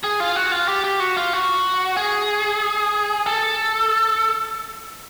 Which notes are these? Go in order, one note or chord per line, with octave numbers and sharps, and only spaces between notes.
G#4
F4
F#4
F4
G4
G4
F#4
F4
F#4
G#4
A4